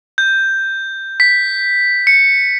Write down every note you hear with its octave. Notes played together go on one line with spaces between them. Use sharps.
G6
B6
C#7